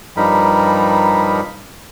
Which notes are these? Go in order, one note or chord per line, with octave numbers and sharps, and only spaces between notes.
G2 F3 G3 D#4 A#4 B5